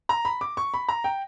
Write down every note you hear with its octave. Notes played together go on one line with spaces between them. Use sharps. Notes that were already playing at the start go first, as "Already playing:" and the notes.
A#5
B5
D6
C#6
B5
A#5
G5